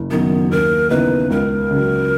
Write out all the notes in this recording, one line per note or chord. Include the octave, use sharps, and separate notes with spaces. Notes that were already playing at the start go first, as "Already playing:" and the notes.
Already playing: F#1
F#2 D#3 B3
D#2 A#4
C#3 E3 B3 D#4 B4
C#2 A#4
C#3 F#3